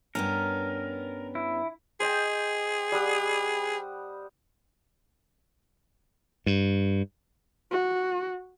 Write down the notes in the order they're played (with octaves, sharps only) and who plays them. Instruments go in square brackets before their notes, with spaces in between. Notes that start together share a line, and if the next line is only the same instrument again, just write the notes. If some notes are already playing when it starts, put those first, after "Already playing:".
[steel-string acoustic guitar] G2 B3 C#4 [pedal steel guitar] A#4
[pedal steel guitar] E4
[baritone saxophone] G#4 [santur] C5 D#5 G5
[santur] G3 F#5 D#6
[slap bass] G2
[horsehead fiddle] F#4